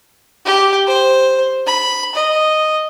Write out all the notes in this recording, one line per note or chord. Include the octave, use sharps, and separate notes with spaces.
G4
C5
B5
D#5